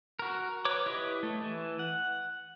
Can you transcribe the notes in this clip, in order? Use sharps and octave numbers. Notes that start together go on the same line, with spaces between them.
F#4 A#4
B4 C#5 D6
E4 G4 B4 C#5 D#5
A3
E3
F#5